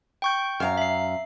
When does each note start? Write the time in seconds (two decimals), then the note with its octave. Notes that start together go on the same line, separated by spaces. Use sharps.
0.22 G5 C#6 G6
0.60 F#2 F5 A#5 F6
0.78 E5 C7